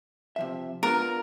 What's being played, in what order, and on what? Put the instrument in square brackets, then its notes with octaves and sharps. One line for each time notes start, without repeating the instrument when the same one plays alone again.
[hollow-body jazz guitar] C3 F3 E5
[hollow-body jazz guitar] B3 D4 F4 [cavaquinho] A#4